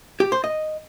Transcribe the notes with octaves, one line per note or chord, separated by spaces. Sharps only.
G4
C5
D#5